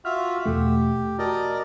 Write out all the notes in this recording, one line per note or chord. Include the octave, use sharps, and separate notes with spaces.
F4 F#4 E5 F6
E2 B2 A3 G4
F#4 A#4 D5 D#5 A5